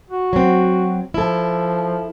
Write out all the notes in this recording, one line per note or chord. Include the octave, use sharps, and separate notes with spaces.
F#4
F#3 C4
F3 E4 A4